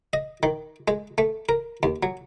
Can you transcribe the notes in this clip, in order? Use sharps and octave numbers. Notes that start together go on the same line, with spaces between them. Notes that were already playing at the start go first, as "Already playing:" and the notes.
D#5
D#3
G#3
A3
A#4
D#2
F#3